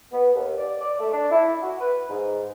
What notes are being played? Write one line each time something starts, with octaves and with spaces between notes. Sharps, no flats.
B3
D#2
D5
D5
A3
D4
E4
F#4
B4
G#2